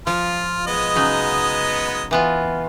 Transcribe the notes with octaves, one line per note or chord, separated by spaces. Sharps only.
F3 F4
G#3 B3 D#5
C#3 F#3 D#4
E3 B3 F4